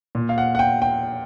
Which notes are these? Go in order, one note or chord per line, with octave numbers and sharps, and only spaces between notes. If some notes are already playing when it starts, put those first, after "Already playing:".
A#2
F5
F#5
F#5
G5
G5